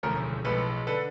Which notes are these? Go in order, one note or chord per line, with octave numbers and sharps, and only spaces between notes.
E1 D2 C#3 F3 A3 A#4
B1 A2 F3 G#3 A4 B4
D3 A4 B4